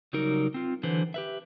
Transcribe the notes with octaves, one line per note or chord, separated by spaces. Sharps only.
C#3 F#3 G3 D#4 A#4
C4 F4
D3 E3 F#3 B4 C5
G4 B4 E5